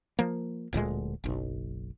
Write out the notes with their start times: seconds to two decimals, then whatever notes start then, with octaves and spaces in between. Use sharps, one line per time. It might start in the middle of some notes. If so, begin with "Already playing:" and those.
0.19 F3 A#3
0.73 D1 D2 A#2 G#3
1.24 F#1 B1